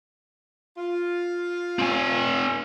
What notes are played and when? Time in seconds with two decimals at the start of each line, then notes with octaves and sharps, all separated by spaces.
0.77 F4
1.79 C4 G#5